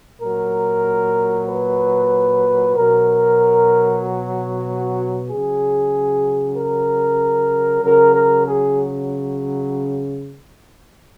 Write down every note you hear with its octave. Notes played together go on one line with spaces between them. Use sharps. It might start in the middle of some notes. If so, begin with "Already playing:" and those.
A#2 F#3 A#4
B4
B2 F#3 A#4
F#4
C#3 F#3 G#4
A#4
C#3 F#3 A#4
A#4
G#4